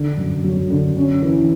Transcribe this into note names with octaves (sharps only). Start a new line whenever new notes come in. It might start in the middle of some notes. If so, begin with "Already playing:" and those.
Already playing: D3
F#2
F#3
D3
C#4
E3